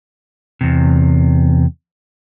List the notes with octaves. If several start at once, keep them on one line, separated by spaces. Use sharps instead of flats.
E2 C3